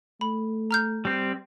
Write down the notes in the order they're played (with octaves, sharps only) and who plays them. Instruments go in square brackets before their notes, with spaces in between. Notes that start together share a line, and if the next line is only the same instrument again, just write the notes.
[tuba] A3 [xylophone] B5
[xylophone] A#5 F6 G6
[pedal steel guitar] G3 C4